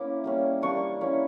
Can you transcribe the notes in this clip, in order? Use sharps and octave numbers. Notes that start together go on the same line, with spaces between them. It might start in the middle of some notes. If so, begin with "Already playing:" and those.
Already playing: A#3 C#4 E4 D6
G3 A#3 C#4
G3 A#3 D4 C#6
A#3 C#4 E4